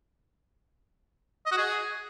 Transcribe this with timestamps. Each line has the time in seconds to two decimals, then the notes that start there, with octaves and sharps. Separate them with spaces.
1.46 D#5
1.52 F#4
1.57 G#4